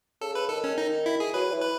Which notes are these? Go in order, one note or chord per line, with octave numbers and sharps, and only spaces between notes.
C#3 A4
B4
D#3 A4
C#4
D#4
E4
G#4
F#3 B4
E3
B4